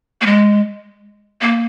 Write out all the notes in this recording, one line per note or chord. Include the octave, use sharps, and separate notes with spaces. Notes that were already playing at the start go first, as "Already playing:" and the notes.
A#3
G#3
A#3